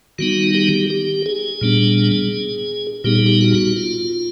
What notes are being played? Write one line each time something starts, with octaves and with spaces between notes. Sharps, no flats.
D#3 G3 B3 D#4 F#4
G4
G4
G#4
A#2 G3 B3 D4
A#2 G3 B3 D#4 G4
G#4
G4
F#4
F4